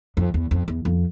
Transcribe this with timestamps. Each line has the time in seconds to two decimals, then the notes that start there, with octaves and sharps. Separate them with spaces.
0.17 F2
0.34 E2
0.51 F2
0.68 E2
0.85 F2